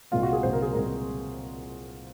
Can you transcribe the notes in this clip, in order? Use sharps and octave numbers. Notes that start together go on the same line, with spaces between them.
C2 A#2 G#3 C4 F4
F#4
G#4
C2 A#2 G#3 C4 C5
A#4
G#4
C2 A#2 G#3 C4 A#4